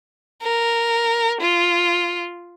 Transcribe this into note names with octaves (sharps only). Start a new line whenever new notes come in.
A#4
F4